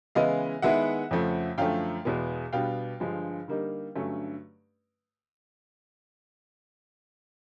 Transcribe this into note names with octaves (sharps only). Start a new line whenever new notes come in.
C#3 E3 G#3 B3 E4 D#5 F5
D#3 G#3 B3 E4 E5 F#5
F2 C#3 F3 A3
F#2 D3 F3 A3 F5 G5
E2 B2 G#3 B3
B2 G3 B3 D4 F5 G5
G2 D3 F3 G#3
D3 G3 A#3 D#4
G2 D3 F#3 A3 C#4